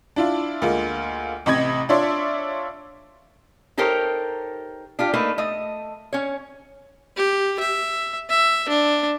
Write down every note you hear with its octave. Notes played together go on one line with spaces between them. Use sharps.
D4 E4 F4
D2 G#3 A#3 F4
A1 C3 D#5 B5 D#6 G#6
D4 F4 C#5 D5 E5 C6
D#4 G4 A4 A#4 C5 C#5
D4 F4 G4
A3 A#3 D4 D#4 B4
A3 D#5
C#4 C#5
G4
E5
E5
D4